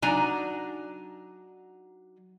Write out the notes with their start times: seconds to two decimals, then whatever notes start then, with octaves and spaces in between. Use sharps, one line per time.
0.02 F#3 D4 D#4 D5 G#5 A#5